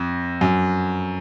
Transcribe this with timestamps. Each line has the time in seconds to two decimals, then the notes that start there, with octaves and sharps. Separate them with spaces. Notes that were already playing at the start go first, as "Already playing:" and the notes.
Already playing: F2
0.41 F#2